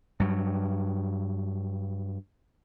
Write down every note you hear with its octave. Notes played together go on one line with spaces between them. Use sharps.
G2 F#3